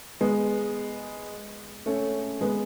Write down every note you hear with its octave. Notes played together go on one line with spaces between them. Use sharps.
G#3 B3
A3 C#4
G#3 B3